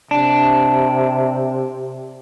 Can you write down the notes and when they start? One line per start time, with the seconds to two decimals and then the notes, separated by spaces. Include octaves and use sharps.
0.11 C3 D4